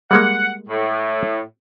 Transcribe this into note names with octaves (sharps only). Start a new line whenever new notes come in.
G3 G#3 A#3 F#5
A2